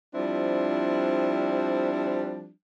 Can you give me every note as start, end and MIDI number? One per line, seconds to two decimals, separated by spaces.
0.15 2.49 53
0.15 2.49 55
0.15 2.49 60
0.15 2.49 62
0.15 2.49 64